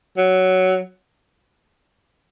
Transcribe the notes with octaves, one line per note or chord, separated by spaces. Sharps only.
F#3